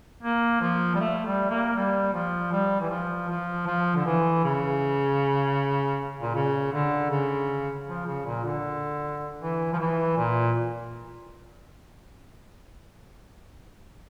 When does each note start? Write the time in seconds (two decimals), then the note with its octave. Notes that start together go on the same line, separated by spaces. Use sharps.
0.23 A#3
0.61 F3
0.95 G3
1.00 A3
1.25 G3
1.50 A#3
1.75 G3
2.13 F3
2.52 G3
2.80 E3
2.90 F3
3.29 F3
3.67 F3
3.96 D3
4.06 E3
4.44 C#3
6.21 A#2
6.34 C#3
6.73 D3
7.10 C#3
7.87 F3
8.06 C#3
8.25 A#2
8.44 D3
9.40 E3
9.73 F3
9.78 E3
10.17 A#2